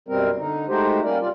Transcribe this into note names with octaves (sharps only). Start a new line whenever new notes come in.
F#2 B2 G3 C4 A#4
D3 D#4
G#3 A3 D#4 F#4 G4 C5
G3 A#3 C#4 A#4 D5
C3 G3 F4 D5